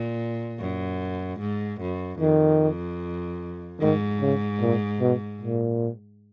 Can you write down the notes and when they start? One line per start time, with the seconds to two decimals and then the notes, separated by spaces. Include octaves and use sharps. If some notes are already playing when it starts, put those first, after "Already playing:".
Already playing: A#2
0.60 F#2
1.40 G#2
1.81 F#2
2.20 F2 D#3
3.80 G#2 D#3
4.21 C#3
4.61 A#2
5.01 B2
5.41 A#2